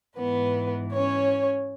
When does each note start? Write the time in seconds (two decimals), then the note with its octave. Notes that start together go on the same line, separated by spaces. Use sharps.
0.18 G#2 E3 B3 B4
0.93 C#4 C#5